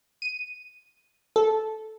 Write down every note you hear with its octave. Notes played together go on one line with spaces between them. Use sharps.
D#7
A4